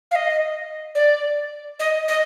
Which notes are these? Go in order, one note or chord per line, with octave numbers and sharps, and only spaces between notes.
F5
D#5
D5
D#5
D#5